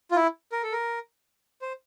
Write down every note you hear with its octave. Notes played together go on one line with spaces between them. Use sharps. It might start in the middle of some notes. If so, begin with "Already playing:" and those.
F4
E4
A#4
A4
A#4
C5